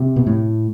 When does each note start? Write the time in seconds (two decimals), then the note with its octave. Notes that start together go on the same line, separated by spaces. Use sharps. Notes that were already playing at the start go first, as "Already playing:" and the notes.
Already playing: C3
0.16 B2
0.27 A2